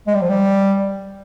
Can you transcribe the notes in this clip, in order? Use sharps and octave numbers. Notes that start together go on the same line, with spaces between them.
G#3
G3
F3
G3